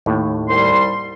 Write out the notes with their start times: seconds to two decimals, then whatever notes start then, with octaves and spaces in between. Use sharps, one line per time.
0.06 D#2 A2
0.49 C2 G3 C6